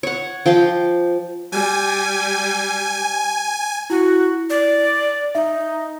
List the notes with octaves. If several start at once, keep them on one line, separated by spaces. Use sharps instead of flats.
C#5 F#5
F3 G5 C6 D6
G3 G#5
E4 F#4
D5
D#4 E5